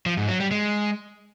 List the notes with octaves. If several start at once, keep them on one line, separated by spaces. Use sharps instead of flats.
F3
G#2
F#3
G3
G#3